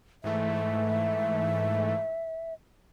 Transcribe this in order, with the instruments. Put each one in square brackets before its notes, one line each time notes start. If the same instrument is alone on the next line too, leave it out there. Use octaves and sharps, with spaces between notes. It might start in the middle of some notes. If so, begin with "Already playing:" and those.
[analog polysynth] G#2 E3 A3 [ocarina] E5